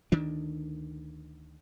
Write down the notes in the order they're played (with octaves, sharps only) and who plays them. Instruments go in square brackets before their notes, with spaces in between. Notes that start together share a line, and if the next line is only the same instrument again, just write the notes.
[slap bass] D2 D#3 D4